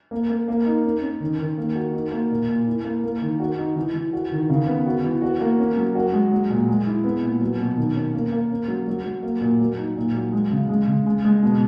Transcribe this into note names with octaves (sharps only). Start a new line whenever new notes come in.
A#3
A#3
A#3
D#4
C#4
C#4
D#3
D#3
A#3
F#4
D#4
A#3
A#2
A#2
E4
A#3
A#3
D#3
F#4
D#4
E3
E3
F#4
D#3
C#3
B3
F#4
E3
F#4
A#3
C#4
F#3
F#4
G#3
F#3
A#2
G#3
E4
B3
A#2
F#3
B2
D#3
C#4
A#3
A#3
C#4
F#3
F#3
F#3
A#3
A#2
F#3
D#4
A#2
F#3
G#3
C#3
G#3
C#3
G#3
G#3
B2